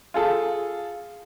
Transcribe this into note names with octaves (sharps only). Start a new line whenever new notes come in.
F4 G#4 A4